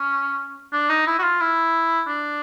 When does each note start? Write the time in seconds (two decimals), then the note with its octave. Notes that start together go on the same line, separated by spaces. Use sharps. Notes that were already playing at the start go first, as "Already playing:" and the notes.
Already playing: C#4
0.73 D4
0.90 D#4
1.07 E4
1.19 F#4
1.23 F4
1.41 E4
2.08 D4